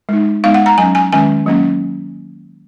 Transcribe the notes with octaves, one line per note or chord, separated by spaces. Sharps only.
G#3 D#4
G#3 B3 D#4 F5
F#5
A#5
F#3 C#4 G#5
G#5
D#3 G#3 C#4 G#5
F#3 A#3 C#4